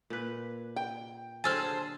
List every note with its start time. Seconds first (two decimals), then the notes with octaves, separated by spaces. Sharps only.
0.10 A#2 B4
0.76 G5
1.44 D3 F#3 G#4 C5 G#5 A5 E6 F6